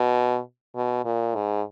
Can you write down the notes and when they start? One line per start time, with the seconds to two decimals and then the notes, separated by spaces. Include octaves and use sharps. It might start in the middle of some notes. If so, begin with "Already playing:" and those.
Already playing: B2
0.76 B2
1.05 A#2
1.35 G#2